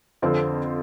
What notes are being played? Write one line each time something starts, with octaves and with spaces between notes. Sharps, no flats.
F2 D3 F3 C4 F4